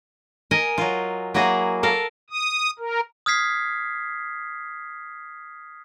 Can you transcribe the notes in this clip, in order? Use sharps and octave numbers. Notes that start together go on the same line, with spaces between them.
A#4 D#5 G#5
F#3 F4
F#3 A#3 E4 F#4 G#4
A4 A#4 F5
D#6
A#4
D#6 F6 G#6 B6 C7